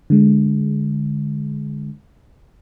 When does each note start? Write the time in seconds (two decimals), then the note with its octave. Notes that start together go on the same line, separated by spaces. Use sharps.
0.10 D3 G#3